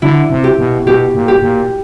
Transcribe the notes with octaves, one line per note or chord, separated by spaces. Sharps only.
D3 E4
C3
G4
B2
B2 G4
A#2
G4
A#2